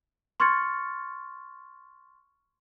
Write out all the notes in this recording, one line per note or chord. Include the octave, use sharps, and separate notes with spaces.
C6 C#6 F6 G#6 A6 C#7